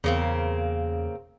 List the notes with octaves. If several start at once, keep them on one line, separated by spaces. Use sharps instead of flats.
E2 C#3 A#3 C4